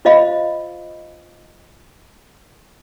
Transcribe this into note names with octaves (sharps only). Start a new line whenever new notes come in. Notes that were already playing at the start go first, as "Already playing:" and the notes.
F4 C5 D#5 F5 B5